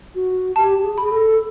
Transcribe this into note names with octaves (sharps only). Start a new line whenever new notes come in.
F#4
G4 A5
G4
G#4
G#4 B5
A4